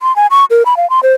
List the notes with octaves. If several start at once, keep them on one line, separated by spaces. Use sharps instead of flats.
C6
G#5
C#6
A#4
B5
F5
C6
C5